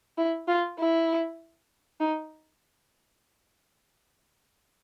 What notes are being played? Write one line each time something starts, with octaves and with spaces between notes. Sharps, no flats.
E4
F4
E4
D#4